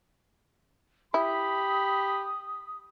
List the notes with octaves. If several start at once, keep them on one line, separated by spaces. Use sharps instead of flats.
E4 G4 B5 D#6